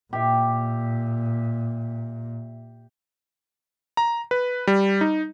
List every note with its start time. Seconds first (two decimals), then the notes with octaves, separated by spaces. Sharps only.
0.13 A#2 G4 E5
3.97 A#5
4.31 B4
4.67 G3
5.01 D#4